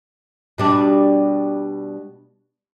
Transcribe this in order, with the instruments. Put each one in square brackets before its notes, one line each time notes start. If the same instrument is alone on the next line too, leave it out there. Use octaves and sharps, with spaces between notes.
[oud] B2 G3 D4